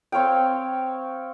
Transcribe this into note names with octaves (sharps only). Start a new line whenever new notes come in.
C4 C#5 F5 G5